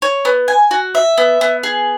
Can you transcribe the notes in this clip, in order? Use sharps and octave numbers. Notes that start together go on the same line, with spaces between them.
C#5
B3
G#5
F#4
E5
B3
B3
G#4